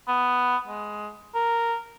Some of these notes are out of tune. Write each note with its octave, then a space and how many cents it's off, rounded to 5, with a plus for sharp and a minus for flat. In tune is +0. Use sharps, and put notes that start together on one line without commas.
B3 +5
G#3 +15
A#4 -5